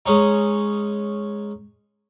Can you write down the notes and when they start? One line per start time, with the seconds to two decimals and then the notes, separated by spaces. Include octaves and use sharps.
0.06 G#3 C#4 D#4